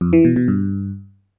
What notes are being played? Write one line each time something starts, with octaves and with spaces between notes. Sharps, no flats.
F2
E3
B2
B2
G2